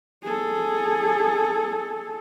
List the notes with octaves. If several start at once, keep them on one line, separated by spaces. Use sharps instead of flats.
G#4 A4